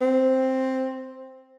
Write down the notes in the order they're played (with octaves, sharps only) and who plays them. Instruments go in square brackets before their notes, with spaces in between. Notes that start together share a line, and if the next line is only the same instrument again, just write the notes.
[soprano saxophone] C4